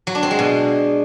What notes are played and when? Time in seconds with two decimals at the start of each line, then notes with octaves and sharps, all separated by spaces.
0.07 F#3
0.15 D4
0.23 C4
0.31 G#3
0.39 B2